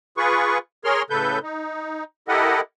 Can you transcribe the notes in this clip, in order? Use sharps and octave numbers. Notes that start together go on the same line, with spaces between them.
F4 G#4 B4 C#6
G#4 A#4 C#5 C6 F6
A2 C#3 A4 B4 G6
D#4
E4 G4 A4 A#4 D#5 F#5